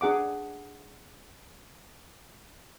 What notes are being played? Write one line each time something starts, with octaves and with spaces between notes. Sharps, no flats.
D4 G#4 F#5 D6